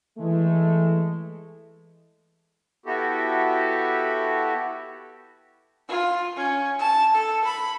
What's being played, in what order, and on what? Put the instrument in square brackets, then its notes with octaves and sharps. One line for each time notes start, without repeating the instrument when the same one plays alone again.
[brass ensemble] E3 G#3 A3
[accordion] B3 E4 F#4 G4 A4
[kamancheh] F4
C#4
A5
A4
B5